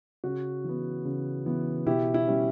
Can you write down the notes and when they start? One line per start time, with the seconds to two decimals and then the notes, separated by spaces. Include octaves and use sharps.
0.24 C#3 F#4
0.64 E3 B3
1.05 C#3
1.46 E3 B3
1.86 B2 E4 G4
2.14 E4
2.28 G3 C#4